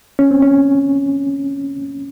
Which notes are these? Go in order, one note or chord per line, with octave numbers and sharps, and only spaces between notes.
C#4
C4
C#4